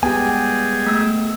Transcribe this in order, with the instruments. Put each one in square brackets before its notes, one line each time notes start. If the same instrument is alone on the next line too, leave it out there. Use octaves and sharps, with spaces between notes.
[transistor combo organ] G3 G#3 G#4 [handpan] B3 G4 [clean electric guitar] G5 G#5
[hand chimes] A3 E6